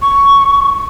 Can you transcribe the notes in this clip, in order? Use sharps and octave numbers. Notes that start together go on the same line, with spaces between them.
C#6